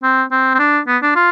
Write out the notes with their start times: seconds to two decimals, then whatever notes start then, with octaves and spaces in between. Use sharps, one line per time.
0.03 C4
0.32 C4
0.54 C4
0.59 D4
0.87 B3
1.02 D4
1.15 F4